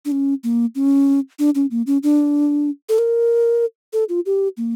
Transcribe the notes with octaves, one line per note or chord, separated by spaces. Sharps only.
D4
C#4
A#3
C#4
D4
C#4
A#3
C#4
D4
A4
A#4
A4
F4
G4
A#3